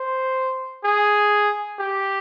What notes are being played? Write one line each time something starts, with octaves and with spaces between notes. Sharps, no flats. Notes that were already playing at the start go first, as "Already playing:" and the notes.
Already playing: C5
G#4
G4